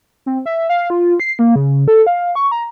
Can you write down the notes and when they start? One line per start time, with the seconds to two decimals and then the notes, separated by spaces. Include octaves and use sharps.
0.26 C4
0.46 E5
0.69 F5
0.90 F4
1.20 C7
1.39 A#3
1.56 C#3
1.88 A4
2.07 F5
2.35 C#6
2.52 A#5